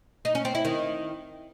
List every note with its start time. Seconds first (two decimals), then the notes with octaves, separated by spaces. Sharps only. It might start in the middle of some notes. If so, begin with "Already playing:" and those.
0.25 D#4
0.35 C#4
0.45 C4
0.55 E4
0.65 D#3